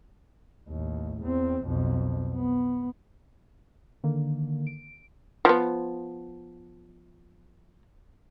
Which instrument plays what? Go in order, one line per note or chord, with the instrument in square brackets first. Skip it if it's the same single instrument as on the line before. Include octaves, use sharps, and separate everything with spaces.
[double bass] A1 D#2
E2 C4
B1 F2
B3
[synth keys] D3 D#3 A#3
D7
[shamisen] F3 B3